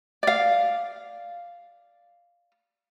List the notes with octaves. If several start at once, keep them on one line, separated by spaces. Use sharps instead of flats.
D5 F5